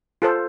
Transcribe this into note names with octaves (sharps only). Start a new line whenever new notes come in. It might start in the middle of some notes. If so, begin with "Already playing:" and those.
F4 A4 C5